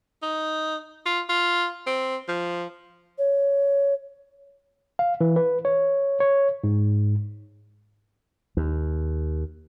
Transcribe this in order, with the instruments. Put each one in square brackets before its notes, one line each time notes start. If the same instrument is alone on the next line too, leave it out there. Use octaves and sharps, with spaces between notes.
[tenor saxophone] D#4
F4
F4
C4
F3
[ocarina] C#5
[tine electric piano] F5
E3
B4
C#5
C#5
G#2
[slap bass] D#2